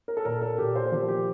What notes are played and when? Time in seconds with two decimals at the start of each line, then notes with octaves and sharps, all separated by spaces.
0.08 A#4
0.17 A4
0.25 A#2 A#4
0.41 A4
0.58 A#2 G4
0.76 C5
0.92 F3 G4
1.08 G4